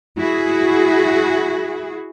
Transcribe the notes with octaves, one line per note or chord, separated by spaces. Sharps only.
E4 F#4 G#4